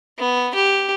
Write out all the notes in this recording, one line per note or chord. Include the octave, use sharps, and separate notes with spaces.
B3
G4